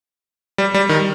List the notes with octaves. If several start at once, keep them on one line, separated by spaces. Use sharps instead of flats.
G3
G3
D#3